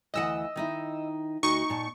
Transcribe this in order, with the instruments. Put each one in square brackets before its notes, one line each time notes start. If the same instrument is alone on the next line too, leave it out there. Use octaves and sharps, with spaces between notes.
[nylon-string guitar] D2 E3 F#5 [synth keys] D#5 E6
[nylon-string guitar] D#3 D#4 E4
[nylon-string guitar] D2 F#4 [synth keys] D#4 [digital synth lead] C#6
[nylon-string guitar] A#2 A5